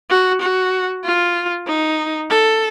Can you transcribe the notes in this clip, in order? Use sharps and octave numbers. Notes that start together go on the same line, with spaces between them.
F#4
F#4
F4
D#4
A4